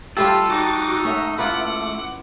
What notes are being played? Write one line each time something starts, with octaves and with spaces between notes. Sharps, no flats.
G3 A3 F4 G4 A4
D#4 F#4 D5 D6
A3 C#4 E5 F#5
E4 F4 B4 F#5 D6